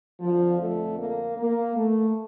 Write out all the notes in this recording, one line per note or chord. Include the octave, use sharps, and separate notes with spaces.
F2 D3 F3
A3
A#3
A#3
A3